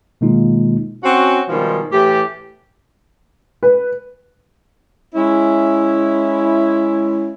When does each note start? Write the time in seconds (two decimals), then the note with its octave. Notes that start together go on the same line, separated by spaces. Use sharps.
0.21 B2 D#3 G#3 A#3 D#4 F4
1.04 C4 C#4 F#4
1.49 B2 D#3 F3 G3 G#3
1.92 A2 E3 G4
3.63 B4
5.15 G#3 C#4 E4